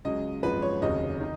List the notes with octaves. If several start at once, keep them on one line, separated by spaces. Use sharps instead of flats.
C#2 C#3 F#3 D#5
G#1 F#2 F3 G#3 B4
C#5
F1 D#2 C#3 F#3 D#5
D#3